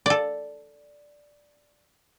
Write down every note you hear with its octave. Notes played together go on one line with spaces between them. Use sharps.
A4 D5